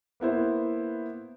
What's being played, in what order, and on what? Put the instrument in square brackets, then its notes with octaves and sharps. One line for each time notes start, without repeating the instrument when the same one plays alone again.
[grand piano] A#3 B3 E4 C5